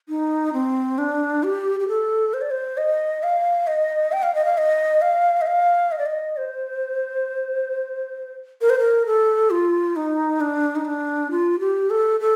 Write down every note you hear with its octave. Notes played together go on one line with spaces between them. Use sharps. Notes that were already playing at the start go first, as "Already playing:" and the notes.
D#4
C4
D4
G4
G4
A4
C5
D5
C5
D#5
F5
D#5
G5
F5
D#5
F5
D#5
F5
D#5
F5
D#5
D5
D#5
C5
A#4
C5
A#4
A4
F4
D#4
D4
D#4
D4
F4
G4
A4
A4